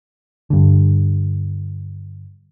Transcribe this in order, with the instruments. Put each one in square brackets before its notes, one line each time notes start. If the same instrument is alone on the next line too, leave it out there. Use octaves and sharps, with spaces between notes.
[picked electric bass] G2 D3